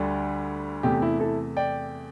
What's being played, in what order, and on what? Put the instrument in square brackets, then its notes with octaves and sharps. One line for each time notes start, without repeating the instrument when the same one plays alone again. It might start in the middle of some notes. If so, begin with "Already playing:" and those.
Already playing: [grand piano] D2 D3 G3
E2 C3 A3 G4
E4
E4 A4
D5 G5